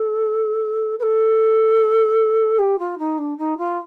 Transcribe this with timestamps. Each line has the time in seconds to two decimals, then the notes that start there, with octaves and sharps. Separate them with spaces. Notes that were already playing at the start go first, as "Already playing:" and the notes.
Already playing: A4
0.99 B4
1.02 A4
2.58 G4
2.79 F4
2.98 D#4
3.18 D4
3.38 D#4
3.58 F4